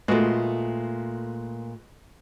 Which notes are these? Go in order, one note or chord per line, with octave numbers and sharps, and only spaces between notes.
A#2 G#3 A3 B3 F#4